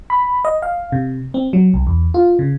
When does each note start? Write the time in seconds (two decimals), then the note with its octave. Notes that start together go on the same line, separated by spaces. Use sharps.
0.10 B5
0.45 D#5
0.62 F5
0.92 C3
1.34 C4
1.53 F#3
1.74 C2
1.87 E2
2.14 F4
2.39 C#3